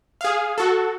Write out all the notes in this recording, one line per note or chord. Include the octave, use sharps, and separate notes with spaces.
G#4 F5
F#4 A4